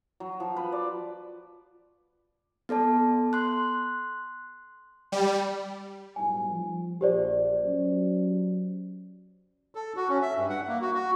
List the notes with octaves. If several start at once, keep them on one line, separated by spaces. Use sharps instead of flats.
F#3
F3
B4
D5
B3 A4 D5 A5
C6 F#6
G3
B1 A2 G3 G#5
F3
A#1 G4 C5 D5
F#3 C#4
A4
F#4
C#4
E5
G2
F#5
A#3
F#4
F#4